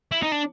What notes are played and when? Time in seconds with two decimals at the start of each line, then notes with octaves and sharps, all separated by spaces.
0.12 E4
0.22 D#4
0.32 D4